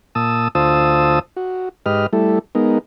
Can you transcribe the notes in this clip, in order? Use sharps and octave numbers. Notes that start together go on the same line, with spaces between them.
A#2 A5 D#6 E6
D2 F4 C5 A5 D#6 E6
F#4
G#2 G4 B4 D#5 F6
G3 A3 E4 A4
G#3 B3 D#4 A#4